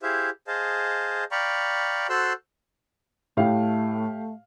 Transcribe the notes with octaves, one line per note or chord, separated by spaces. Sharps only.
E4 G4 G#4 C5 E5 F5
G#4 C5 D#5 F5 A5
D5 F5 G5 A#5 B5 C#6
F#4 A4 C5 C6 E6 F#6
A2 A3 G4 F5